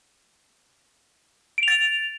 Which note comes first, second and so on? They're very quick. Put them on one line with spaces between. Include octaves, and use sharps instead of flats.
D7 F7 A6